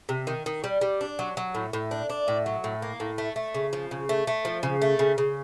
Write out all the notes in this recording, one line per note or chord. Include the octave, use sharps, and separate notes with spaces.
C3
D#3
D#3
G3
G3
D4
F#3
F#3
A2
A2
D4
D4
A2
F#3
A2
A#3
A2
A3
A3
C#3
F3
C#3
A3
A3
F3
C#3
A3
C#3
C#3